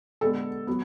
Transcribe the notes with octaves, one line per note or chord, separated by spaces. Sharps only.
D3 G#3 B3 A4
F#3 B3